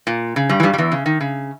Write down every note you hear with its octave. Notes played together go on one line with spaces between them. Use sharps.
A#2
C#3
G2 G3
E3
G2 G3
G3
E2 E3
C#3
D#3
C#3